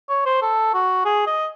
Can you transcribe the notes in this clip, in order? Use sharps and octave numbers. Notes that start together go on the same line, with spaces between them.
C#5
C5
A4
F#4
G#4
D#5